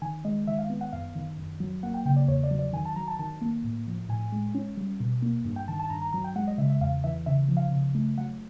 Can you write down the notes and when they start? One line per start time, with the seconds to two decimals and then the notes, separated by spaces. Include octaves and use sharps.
0.02 D#3 G#5
0.25 G#3 D#5
0.47 D#3 E5
0.59 F5
0.70 B3
0.81 F#5
0.92 F#2 F5
1.15 D#3
1.37 F#2
1.60 F#3
1.83 A#3 F#5
1.94 G5
2.05 C#3 G5
2.16 D5
2.28 E2 C#5
2.44 D5
2.51 F#3
2.59 D5
2.73 D#3 G#5
2.85 A5
2.96 F#3 A#5
3.08 A5
3.19 D#3 A5
3.41 A#3
3.64 A2
3.87 F3
4.09 A2 G#5
4.32 G#3
4.55 C#4
4.77 G3
5.00 B2
5.22 A#3
5.45 G2
5.56 G5
5.68 D#3 A5
5.79 A5
5.90 G2 A#5
6.02 A#5
6.13 F#3 A#5
6.24 G5
6.36 G#3 F#5
6.47 D#5
6.58 C#3 E5
6.70 E5
6.81 E2 F5
7.04 E3 E5
7.26 C#3 E5
7.48 F3
7.57 F5
7.71 C#3
7.95 A3
8.17 F#3 F#5